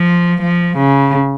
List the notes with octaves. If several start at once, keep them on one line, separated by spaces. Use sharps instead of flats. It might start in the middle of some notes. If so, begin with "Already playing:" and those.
Already playing: F3
F3
C#3